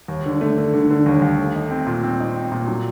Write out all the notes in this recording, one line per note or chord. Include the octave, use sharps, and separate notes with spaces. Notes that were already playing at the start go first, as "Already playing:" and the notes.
D#2
D3
A3
D3
D3
D3
D#2
D#2
A3
D#4
C4
A#2
C4
D#4
C4
A#2
F#3